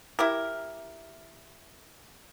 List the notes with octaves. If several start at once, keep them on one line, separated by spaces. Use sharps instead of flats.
E4 G4 A#4